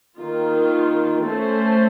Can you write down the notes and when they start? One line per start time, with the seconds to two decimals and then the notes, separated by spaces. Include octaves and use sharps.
0.19 D#3 A#3 F4
1.25 A3 C#4 A4 C5